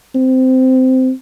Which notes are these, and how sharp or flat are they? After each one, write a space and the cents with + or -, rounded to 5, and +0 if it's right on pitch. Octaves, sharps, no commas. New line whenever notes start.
C4 -15